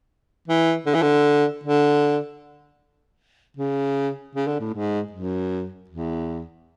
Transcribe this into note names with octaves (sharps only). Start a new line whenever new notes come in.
E3
D3
E3
D3
D3
C#3
C#3
D3
A2
G#2
F#2
E2